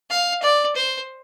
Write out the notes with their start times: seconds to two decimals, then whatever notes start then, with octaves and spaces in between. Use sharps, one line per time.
0.10 F5
0.42 D5
0.76 C5